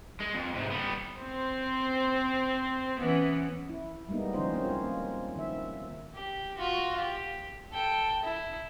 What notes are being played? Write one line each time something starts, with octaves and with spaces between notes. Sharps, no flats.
G#3
F2
G#2 C3
G3 B3
C4 C5
E3 B3 C#4
E4
G3 G#3 A#3 B3 D#4
D#3 F3 C#4 D#4 F4 C5
A#3 C4 C#4
A#3 E4 F4
D#3 E5
G4
F4 F#4
G4
A4 G5
E4